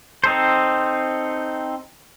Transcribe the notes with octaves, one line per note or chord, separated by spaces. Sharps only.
C4 D#4 A4 C5